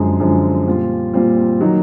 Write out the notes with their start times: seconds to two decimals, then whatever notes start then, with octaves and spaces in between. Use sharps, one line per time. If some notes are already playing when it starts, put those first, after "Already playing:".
Already playing: F#2 D3 F3 G#3
0.20 F#2 D3 F3 G#3
0.67 A#2 G3 C4 F4
1.14 A#2 G3 C4 F4
1.61 D#3 F#3 A#3 D#4